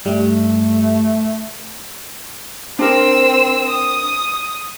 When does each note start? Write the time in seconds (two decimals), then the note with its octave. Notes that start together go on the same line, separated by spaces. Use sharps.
0.05 G2 G3 A3
2.79 C4 D4 A#4 E6
3.68 D#6